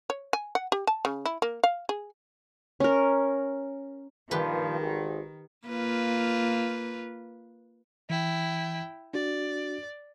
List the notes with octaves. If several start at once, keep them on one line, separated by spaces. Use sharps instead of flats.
C#5
G#5
F#5
G4
A5
C#3
E4
A#3
F5
G#4
C#4 A#4
G2 A#2 D#3 F3 G4 B4
G#1
A#3 F4 B4
E3 E4 G5
D4 F#4 D5